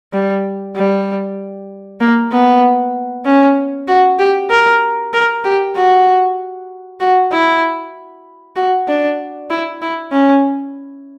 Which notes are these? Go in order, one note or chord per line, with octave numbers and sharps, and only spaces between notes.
G3
G3
A#3
B3
C#4
F#4
G4
A#4
A#4
G4
F#4
F#4
E4
F#4
D4
E4
E4
C#4